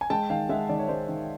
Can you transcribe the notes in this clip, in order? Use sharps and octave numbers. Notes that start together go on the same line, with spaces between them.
G#5
G#3 G5 A5
D#3 F5 G5
G#3 E5 F#5
D#3 D5
C#5
G#3 C5 D5
D#3